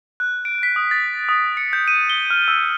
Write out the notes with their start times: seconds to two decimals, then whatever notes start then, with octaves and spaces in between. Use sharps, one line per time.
0.20 F#6
0.45 D7
0.63 B6
0.76 D#6
0.91 A6
1.29 D#6
1.57 C#7
1.73 G6
1.88 D#7
2.10 G7
2.30 F6
2.48 E6